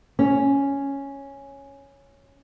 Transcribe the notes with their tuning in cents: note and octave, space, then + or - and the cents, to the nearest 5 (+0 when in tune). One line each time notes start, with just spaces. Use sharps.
C#4 +0